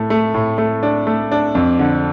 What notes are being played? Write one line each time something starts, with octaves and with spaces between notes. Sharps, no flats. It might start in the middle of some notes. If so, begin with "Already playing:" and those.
Already playing: A2 A3
A3
A2
A3
D4
A3
D4
F2
D3